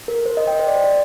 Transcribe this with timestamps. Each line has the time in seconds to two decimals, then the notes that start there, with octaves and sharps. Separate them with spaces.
0.08 A#4
0.26 C5
0.37 D#5
0.47 G5
0.59 C5
0.67 D5
0.75 C5
0.84 D5